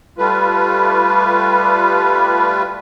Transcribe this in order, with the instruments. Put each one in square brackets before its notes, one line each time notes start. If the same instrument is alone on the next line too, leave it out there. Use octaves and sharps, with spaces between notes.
[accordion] G3 A3 F4 B4